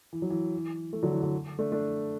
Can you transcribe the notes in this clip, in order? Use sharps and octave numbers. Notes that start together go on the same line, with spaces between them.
E3
F#3
E3
E3 A3
D3 F#3
E3
D3
A3 D4
A3 D4